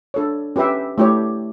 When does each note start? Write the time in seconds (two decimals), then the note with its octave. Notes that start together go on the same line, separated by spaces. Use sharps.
0.14 D4 A4 C#5
0.56 C#4 G4 B4 E5 G5
0.98 A3 E4 G4 C#5